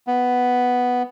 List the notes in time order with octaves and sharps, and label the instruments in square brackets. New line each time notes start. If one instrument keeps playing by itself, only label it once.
[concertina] B3